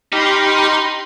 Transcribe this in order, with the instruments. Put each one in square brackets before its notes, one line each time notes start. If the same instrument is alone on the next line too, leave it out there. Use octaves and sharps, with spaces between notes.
[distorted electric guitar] D#4 [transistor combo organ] G4 D6 F6 [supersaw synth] B5 C6